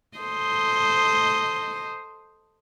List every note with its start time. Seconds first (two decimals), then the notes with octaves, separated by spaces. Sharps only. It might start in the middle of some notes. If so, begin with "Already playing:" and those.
0.18 A4 C5 D#5